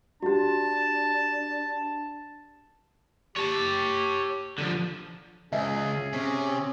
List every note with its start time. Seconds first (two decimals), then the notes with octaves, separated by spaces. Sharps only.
0.23 D4 F#4 G4 A5
3.36 G4 C#5 A5
4.58 D3 F3
5.53 C#2 G#4 E5
6.13 C3 C#4